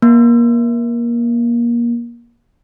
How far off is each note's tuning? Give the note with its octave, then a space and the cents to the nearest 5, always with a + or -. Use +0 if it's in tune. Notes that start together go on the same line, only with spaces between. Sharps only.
A#3 +25